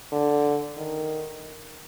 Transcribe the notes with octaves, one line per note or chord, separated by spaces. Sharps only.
D3
D#3